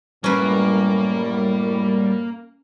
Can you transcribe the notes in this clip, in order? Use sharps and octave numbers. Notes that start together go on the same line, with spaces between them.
F#2 A2 G3 A#3 C#4 B4